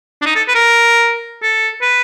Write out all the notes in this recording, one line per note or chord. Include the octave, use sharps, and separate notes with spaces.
D4
D#4
A4
B4
A#4
A4
B4